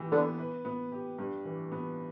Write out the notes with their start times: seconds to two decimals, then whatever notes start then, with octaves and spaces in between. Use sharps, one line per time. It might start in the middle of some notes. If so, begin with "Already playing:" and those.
Already playing: E3 G4
0.11 D3 B3
0.39 B4
0.65 B3
0.92 G4
1.18 G2
1.45 E3
1.72 B3